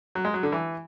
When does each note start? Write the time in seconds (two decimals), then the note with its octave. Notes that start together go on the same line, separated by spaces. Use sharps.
0.15 F#3
0.25 G#3
0.34 F#3
0.43 D3
0.52 E3